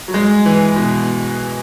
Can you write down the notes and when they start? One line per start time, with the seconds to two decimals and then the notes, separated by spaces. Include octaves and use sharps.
0.08 F#3
0.14 G#3
0.46 E3
0.76 B2